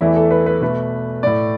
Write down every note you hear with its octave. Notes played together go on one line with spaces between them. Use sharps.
E2 E3 A3 E4
A4
B4
B4
B2 A3 B4
A2 A3 D5